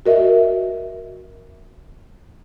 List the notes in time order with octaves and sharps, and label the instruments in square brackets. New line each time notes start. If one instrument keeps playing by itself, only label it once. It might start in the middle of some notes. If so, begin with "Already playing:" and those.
[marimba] F#4 A#4 D#5 E5